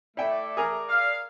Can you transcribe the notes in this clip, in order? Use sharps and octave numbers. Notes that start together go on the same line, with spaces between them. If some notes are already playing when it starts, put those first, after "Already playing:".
A3 E4 D5 G5
G#4 A#4
F5